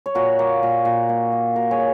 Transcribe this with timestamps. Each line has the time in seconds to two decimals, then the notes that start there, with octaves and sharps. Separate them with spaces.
0.06 C#5
0.15 A#2 F#4 A#4
0.39 A#3
0.63 A#2
0.85 A#2
1.09 A#3
1.32 A#3
1.56 A#2 F#4 A#4
1.71 G#4 C#5